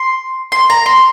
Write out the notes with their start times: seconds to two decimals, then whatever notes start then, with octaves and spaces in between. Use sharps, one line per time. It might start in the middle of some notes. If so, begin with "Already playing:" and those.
Already playing: C6
0.52 C6
0.70 A#5
0.86 C6